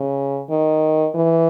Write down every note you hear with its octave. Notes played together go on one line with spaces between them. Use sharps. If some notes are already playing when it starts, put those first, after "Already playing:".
Already playing: C#3
D#3
E3